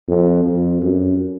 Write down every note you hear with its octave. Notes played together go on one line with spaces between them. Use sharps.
F2
F2
F#2